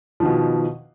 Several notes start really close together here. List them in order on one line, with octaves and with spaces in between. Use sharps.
F3 D#3 B2